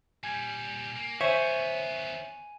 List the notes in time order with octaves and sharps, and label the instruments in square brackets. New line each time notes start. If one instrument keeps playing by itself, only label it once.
[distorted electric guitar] A#2 G3 [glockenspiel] G#5 G#6
[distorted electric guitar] A#3
[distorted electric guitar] D#3 B3 [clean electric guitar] C5 C#5 [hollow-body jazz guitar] E5 [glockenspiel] G#5 D#7